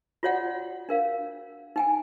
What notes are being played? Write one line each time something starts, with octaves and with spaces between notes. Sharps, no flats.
F4 F#4 C#5 D5 F#5 G5
D4 A#4 F5
D#4 G5 G#5